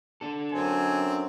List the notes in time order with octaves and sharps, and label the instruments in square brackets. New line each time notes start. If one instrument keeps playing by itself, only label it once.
[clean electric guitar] D4 A4
[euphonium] F#2 [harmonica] C4 [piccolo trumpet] G#5